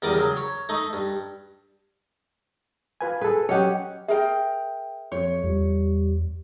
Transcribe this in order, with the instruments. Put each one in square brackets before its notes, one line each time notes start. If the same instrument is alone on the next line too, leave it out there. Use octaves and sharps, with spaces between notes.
[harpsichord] E2 G3 A#4 D5 D#6
C#3 F#3
C#5
A3 D#4
G2
[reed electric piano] F4 B4 G#5
[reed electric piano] G#4 A4 [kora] B4
[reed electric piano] F#3 D#5 F#5 [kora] C#4 G4
[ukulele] G#4 A#4 G5 [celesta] E5
[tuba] F2 [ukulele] C#5
[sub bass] E2 [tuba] G3